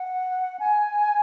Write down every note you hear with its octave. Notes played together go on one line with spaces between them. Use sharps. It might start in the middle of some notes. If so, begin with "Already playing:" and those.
Already playing: F#5
G#5